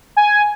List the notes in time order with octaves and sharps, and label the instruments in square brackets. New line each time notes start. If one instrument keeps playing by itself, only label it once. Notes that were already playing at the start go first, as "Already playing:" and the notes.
[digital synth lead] G#5